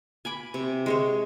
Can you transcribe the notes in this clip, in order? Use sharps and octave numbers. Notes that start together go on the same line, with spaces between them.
G#5 B5 D6
C3
G#3 C5 C#5